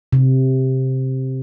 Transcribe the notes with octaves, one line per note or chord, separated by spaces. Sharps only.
C3